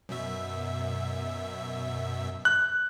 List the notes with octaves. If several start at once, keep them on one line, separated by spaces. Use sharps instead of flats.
F#2 B2 E5
F#6